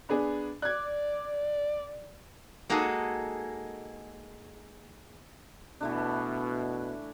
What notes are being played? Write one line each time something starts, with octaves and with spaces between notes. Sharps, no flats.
B3 D4 G#4
D5 F#6 G#6
G#3 A#3 D#4 F#4 G#4 A4
B2 E3 A3 D4